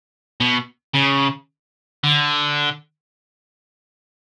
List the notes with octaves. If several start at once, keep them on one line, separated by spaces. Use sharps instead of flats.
B2
C#3
D3